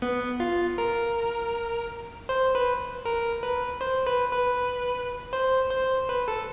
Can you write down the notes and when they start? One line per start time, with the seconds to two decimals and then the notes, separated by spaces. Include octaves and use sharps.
0.02 B3
0.40 F4
0.78 A#4
2.29 C5
2.55 B4
3.05 A#4
3.43 B4
3.81 C5
4.07 B4
4.32 B4
5.33 C5
5.70 C5
6.09 B4
6.28 A4